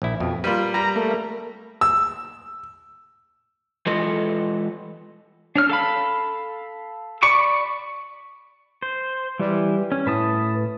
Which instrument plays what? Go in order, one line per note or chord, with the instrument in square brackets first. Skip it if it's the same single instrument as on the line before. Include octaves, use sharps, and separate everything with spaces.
[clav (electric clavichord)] A#1 E4
F2 B2
[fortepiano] G3 A#3 F4 [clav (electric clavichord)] B4
[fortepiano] G3 [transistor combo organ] A#5
[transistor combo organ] A3 A#3
[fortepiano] E6
[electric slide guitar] E3 G#3 F4 A4 B4 D#5
[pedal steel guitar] D4 C#5 F6
A4 F5 B5
D5 B5 C#6 D6
C5
[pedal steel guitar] E3 [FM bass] G3
[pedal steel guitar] C#4
[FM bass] A2 [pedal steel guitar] B4 A5 D#6